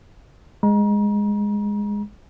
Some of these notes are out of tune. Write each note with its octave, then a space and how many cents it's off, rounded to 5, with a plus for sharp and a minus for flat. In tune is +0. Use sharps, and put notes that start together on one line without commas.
G#3 -10 A#5 +35